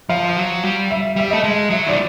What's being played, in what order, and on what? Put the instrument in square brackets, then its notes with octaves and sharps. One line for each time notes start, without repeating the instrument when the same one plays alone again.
[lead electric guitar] F3 [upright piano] F5
[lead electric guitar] F#3
G3
[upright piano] E5
[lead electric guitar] G3 [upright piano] E5
[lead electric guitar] A3 [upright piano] D#5
[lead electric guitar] G#3
[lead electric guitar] F#3 [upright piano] E5
[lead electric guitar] D#3 [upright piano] D5